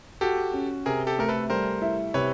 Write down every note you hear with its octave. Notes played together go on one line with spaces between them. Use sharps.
F#4 G4 A4
C#4
C3 G#4 A#4
G4 A4
A3 A#4
A4 B4
G3 A#4 C5
E4
C3 B4 C#5